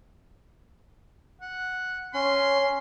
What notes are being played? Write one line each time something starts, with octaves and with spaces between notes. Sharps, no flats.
F#5
C#4 C6